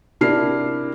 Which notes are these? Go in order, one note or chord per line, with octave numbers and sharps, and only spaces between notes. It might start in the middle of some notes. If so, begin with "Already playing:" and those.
C3 D4 E4 A#4 F6 C7